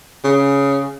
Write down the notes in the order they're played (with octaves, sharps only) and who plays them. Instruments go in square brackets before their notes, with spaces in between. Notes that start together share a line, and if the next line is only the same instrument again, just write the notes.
[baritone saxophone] C#3